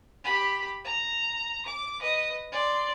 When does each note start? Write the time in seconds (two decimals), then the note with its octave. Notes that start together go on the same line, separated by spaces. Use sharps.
0.24 G4 B5
0.84 A#5
1.66 D6
2.00 B4 D#5
2.52 D5 C6